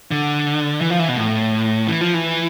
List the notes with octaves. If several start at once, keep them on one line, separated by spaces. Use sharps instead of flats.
D3
E3
F3
E3
B2
A2
E3
F3
E3